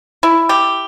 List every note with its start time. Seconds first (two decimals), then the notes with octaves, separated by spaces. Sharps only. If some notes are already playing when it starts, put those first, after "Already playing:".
0.23 E4
0.49 G4